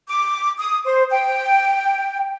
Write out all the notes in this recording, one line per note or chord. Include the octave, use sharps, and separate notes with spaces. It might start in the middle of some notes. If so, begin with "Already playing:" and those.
D6
D#6
C5
G5